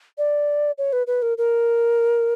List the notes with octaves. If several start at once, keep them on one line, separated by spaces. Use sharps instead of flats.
D5
C#5
B4
B4
A#4
A#4